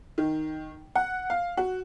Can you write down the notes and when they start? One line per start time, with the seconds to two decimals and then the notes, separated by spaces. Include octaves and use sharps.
0.18 D#3
0.95 F#5
1.30 F5
1.57 F#4